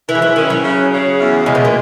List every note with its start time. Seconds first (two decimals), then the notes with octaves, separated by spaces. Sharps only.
0.08 E3 E4
0.15 G#3
0.22 F#3
0.36 D#3 C#4
0.50 F#3
0.64 C#3
0.91 C#3
1.19 E2
1.46 C#3 G#3
1.55 B2
1.65 A#2